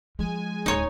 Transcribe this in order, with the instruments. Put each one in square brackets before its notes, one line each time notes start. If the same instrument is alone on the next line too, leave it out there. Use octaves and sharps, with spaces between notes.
[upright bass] F3 [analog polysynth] G#3 G#5
[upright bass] D1 D2 [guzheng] D#4 C#5